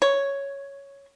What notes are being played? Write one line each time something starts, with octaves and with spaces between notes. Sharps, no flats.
C#5